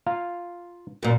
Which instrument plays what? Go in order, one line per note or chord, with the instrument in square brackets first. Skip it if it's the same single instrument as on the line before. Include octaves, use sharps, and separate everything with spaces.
[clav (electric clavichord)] F4 F5 A#5
[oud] F#2 A#2